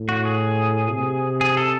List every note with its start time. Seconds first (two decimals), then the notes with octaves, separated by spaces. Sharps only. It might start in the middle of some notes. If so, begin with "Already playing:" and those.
Already playing: A2
0.09 F#4
0.25 G#4
0.91 C3
1.41 G#4
1.57 A4